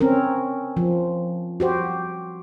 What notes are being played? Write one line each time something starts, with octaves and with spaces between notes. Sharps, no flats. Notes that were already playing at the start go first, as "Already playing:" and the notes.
C4 C#4 A#4
F3
F#4 G4 C5